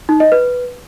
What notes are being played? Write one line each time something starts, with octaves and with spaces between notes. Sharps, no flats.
D#4
D#5
B4